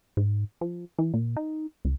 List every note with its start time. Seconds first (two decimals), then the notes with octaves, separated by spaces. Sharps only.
0.17 G#2
0.61 F3
0.98 E3
1.14 A#2
1.37 D#4
1.85 C#2